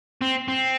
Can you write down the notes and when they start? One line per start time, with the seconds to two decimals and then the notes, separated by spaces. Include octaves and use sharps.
0.22 C4
0.48 C4